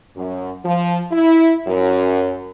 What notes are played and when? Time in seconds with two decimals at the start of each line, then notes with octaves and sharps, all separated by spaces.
0.16 F#2
0.64 F3
1.12 E4
1.67 F#2